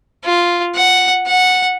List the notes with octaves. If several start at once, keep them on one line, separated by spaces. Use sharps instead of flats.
F4
F#5
F#5